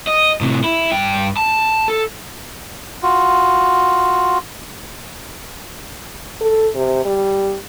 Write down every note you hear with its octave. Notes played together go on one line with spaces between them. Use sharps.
D#5
A2 C3
E4
G2 G5
A5
A4
F4 F#4
A4
C3
G3